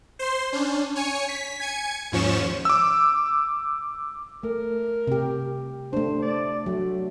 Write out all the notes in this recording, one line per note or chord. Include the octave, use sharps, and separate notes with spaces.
C5 C6
C#4 D4
C#5 G#5 C#7
B6
G#5 G#6 C#7
D#2 G#2 F3 C#4 C#6 E7
D6 E6
A3 A#4
C3 G4
A3 D4 C5
D5
F#3 A3